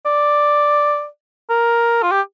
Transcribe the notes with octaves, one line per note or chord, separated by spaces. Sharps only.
D5
A#4
F4
G4